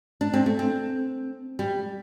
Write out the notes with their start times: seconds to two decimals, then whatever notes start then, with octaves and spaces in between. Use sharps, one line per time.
0.21 D4
0.34 C4
0.46 A3
0.59 C4
1.59 G3